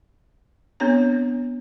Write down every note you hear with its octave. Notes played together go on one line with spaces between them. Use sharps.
B3 C4 D4 C#5 A#5